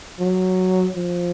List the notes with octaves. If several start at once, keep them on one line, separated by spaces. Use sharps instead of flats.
F#3
F3